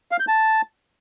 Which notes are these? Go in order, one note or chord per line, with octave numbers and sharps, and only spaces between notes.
F5
G6
A5